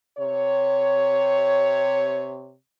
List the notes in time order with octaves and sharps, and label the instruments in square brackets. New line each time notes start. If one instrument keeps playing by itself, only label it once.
[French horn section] C3 C#5